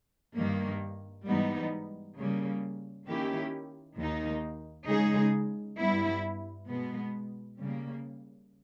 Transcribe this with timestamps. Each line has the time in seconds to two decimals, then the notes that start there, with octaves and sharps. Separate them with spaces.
0.37 G2 D#3 A#3
1.27 G#2 E3 G3 B3 D#4
2.17 C#3 G3 A#3
3.07 D#3 A#3 C#4 E4 G4
3.97 D#2 D#3 A#3 D#4
4.88 C#3 G#3 D#4 G#4
5.78 G2 G3 B3 E4
6.68 B2 G#3 B3
7.59 C#3 G3 A#3